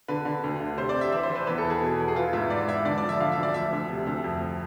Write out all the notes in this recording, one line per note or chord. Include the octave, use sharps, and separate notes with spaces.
D3 B4
D3
D2
D3
C3 C5
D5
C3
E5
E3 E5
C5
E3
B4
E2 B4
A4
E2
G#4
B2
E2
G#4
E3 F4
G#2 E5
G#2 D5
E3 E5
D3 D5
D5
F3
E5
D3 F5
D2 E5
D5
F3 E5
D2
C3
D2
F2